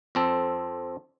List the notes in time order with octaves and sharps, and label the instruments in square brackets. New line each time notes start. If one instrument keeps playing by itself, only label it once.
[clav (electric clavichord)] F2 C4 A4